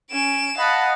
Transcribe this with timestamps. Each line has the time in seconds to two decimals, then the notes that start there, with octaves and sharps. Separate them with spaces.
0.11 C#4 D7 E7
0.58 D#5 F5 F#5 A5 B5